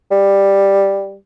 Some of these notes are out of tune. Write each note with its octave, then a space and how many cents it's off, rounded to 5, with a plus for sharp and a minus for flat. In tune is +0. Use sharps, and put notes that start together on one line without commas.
G3 +5